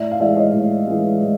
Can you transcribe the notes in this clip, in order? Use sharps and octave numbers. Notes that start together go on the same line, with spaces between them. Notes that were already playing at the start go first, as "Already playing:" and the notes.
Already playing: A2 D5 E5
F5
E3 G#3 D5 E5
C#5 D#5
A2
E3 G#3
A2